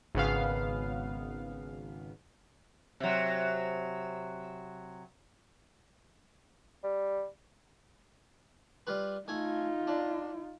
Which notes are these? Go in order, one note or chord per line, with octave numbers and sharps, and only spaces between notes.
G#1 C#3 B3 F5
C3 F#3
G3
G3 F4 B4
A3 D#4 F4 G#5
D4